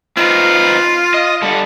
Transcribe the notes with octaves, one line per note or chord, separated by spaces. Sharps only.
C4 D#4 F4 B4
D#5
D3 G3 A4